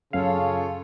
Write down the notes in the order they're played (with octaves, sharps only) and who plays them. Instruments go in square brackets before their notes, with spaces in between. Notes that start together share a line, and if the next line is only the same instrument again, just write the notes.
[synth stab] F#2 F5 [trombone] C#3 [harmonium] F4 A4 C#5